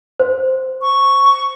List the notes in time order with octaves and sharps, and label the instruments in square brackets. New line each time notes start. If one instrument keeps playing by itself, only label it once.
[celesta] C5
[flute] C#6